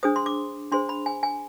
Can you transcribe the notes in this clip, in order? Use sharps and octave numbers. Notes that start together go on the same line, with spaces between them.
D4 G#4 C5 D#6
C6
D6
D4 G#4 C5 C6
B5
G#5
G#5